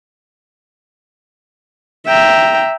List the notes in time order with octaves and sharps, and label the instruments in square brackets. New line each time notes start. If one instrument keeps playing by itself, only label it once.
[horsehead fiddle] E5 [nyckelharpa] G5 A#5